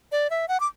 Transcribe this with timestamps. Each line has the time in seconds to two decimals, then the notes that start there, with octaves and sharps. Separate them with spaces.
0.12 D5
0.30 E5
0.48 F#5
0.60 D6